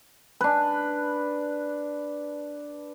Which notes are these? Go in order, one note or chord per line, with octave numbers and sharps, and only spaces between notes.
D4 B4